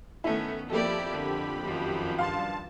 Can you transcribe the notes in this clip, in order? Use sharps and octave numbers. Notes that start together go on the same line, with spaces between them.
D#3 A3 B3 C#4 E4
F2 A#3 E4 G4 A4 D5 B5
D3
F#2 D#3 F3
G2 F5 A5 C6